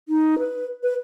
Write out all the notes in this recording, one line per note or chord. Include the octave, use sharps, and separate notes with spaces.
D#4
B4
B4